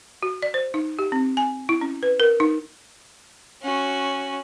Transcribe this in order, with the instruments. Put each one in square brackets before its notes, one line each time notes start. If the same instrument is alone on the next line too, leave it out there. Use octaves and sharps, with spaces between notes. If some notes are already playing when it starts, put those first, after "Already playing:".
[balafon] F#4
D5
C5
D#4
G4
C4
G#5
E4
C#4
B4
A#4
D#4
[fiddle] C#4 F#4